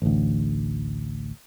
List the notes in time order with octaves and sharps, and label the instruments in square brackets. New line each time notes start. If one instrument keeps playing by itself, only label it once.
[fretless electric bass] A1 D2